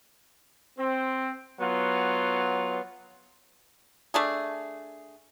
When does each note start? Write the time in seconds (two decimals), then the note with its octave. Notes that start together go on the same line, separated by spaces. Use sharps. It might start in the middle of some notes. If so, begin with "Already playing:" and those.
0.78 C4
1.60 F#3 B3 F4
4.14 A3 D4 G#4